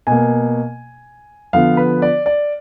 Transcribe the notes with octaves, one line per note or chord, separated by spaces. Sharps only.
B2 A#3 G#5
D3 F3 B3 F5
B4
D5
D5